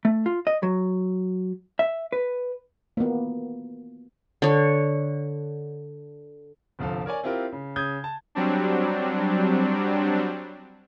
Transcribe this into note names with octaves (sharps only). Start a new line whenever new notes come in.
A3
F4
D#5
F#3
E5
B4
A#3 B3
D3 C#5
G1 C2 F3 A4 F5
A#4 C#5 D5 G#5
C4 E4 F4 G4 A#4
C#3
C#3 D#6 G6 G#6
A5
F#3 G3 C4 D4